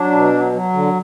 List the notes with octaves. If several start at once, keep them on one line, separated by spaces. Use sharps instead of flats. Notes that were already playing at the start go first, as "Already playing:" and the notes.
Already playing: F#3 D4
B2
F#3
F#3
D3